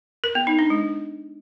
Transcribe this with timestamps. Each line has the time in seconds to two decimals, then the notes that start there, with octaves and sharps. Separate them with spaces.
0.24 A#4
0.35 B3
0.47 D#4
0.59 D4
0.70 G#3